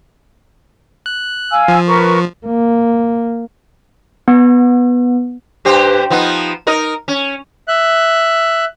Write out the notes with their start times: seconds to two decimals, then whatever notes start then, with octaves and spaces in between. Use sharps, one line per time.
1.06 F#6
1.51 F5 G#5 E6
1.68 F3
1.87 A#4 B4 C#6
2.46 A#3
4.28 B3
5.65 G2 G4 C5
6.10 F3 B3 D#4
6.67 D#4 A#4 D#5
7.08 C#4
7.68 E5 F#6